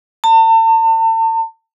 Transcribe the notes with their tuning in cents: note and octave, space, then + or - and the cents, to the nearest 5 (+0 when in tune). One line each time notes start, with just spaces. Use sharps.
A5 +40